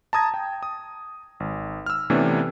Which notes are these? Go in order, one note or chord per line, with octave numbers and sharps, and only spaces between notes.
A5 A#5 D#6 G#6 A#6
G5
D#6
G#1
E6 F6
C3 E3 A3 B3 C#4 D4